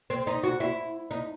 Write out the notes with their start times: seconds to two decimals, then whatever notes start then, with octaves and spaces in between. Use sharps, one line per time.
0.10 C4
0.27 D#4
0.43 F#4
0.60 E4
1.11 D#4